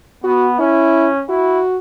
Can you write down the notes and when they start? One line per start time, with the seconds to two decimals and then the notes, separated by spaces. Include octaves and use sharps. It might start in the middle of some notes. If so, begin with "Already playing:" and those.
0.24 B3 F#4
0.59 C#4 E4
1.29 E4 F#4